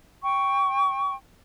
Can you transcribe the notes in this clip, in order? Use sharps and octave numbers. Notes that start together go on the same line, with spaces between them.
G5 C#6